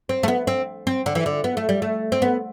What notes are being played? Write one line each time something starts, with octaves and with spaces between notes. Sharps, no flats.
C4
A3
B3
C4
C4
D3
E3
D3
B3
A3
G3
A3
C4
B3